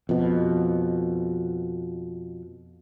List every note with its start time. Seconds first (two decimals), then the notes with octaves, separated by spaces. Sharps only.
0.09 F2 B2